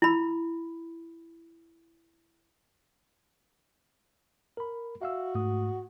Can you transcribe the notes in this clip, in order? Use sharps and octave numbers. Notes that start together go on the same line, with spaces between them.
E4 B5
A#4 B5
F#4 E5 F5 E6
G#2 A3 D#6